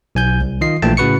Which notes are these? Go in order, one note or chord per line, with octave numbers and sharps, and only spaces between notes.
B1 G#5 G6
C2
D#3 F4 D#5 C7
A#1 A#2 E3 A3 G5 A5
A2 C#3 F#4 B4 C#6 C#7